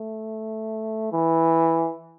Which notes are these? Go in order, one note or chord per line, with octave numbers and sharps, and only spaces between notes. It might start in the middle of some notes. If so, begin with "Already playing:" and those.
Already playing: A3
E3